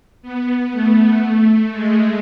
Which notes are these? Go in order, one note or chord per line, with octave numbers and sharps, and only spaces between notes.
B3
A3
A3
G#3